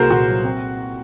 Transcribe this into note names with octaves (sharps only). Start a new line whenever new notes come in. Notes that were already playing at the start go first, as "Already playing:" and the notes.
Already playing: C2 A#3 F#4 G#4 A#4 C5
A#2 F#4
F#3
C4